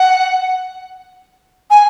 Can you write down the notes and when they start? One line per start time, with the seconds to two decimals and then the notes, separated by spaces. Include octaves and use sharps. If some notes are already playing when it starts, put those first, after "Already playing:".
Already playing: F#5
1.70 G#5